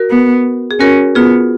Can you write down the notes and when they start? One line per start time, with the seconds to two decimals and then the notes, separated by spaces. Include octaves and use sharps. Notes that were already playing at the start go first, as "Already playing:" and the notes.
Already playing: F#4 A#4
0.10 B3
0.71 G#4
0.79 C#4 F#4 A#4
1.15 B3 F4 G#4